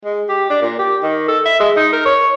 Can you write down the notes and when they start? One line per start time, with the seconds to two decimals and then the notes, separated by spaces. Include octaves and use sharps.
0.05 G#3
0.29 G4
0.50 D4
0.61 A#2
0.79 G4
1.03 D#3
1.28 A4
1.45 E5
1.60 G#3
1.77 D#4
1.93 A#4
2.05 C#5